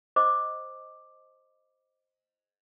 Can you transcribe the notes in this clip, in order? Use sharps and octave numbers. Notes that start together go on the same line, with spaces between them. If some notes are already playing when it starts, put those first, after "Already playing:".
C5 D#5 D6